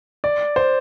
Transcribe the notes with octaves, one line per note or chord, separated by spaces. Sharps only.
D5
C5